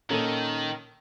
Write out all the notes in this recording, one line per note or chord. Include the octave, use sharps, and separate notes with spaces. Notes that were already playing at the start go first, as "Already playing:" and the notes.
A#2 D#3 C#4 A4